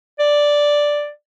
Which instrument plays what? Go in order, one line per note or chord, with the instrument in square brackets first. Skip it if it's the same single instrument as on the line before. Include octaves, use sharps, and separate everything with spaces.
[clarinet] D5